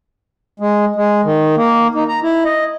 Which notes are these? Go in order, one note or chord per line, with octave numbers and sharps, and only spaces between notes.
G#3
G#3
D#3
A#3
D#4
A#5
E4
D#5